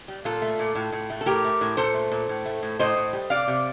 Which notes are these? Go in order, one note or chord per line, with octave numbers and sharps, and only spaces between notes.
G3
A#2 F4 A4
A3
A#2
A2
A2
A3
A4
A2 G4 A#4
A3
A2
A#2 A4 C5
A3
A#2
A2
A3
A2
A2 C5 D#5
A2
G3
C3 D5 F5
C3